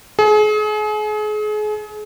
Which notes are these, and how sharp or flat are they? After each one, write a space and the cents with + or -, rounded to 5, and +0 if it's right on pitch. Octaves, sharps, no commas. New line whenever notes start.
G#4 +35